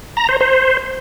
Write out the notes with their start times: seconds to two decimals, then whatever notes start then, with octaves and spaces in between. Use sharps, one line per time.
0.17 A#5
0.29 C5
0.41 C5